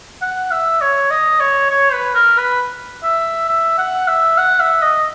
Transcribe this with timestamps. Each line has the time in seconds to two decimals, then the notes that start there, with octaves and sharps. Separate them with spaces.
0.22 F#5
0.51 E5
0.81 C#5
1.11 D#5
1.40 C#5
1.70 C#5
1.93 B4
2.15 A#4
2.37 B4
3.03 E5
3.49 E5
3.78 F#5
4.08 E5
4.37 F#5
4.60 E5
4.82 D#5